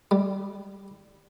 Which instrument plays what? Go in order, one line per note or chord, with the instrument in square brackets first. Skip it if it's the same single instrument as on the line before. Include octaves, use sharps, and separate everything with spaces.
[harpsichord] G3